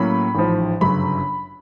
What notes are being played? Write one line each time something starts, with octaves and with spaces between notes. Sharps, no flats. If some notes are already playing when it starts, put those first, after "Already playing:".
Already playing: A2 F#3 A#3 C#4 B5
A1 G#2 F3
G1 F#2 C#3 F#3 B5